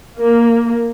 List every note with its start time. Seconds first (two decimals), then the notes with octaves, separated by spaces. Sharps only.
0.18 A#3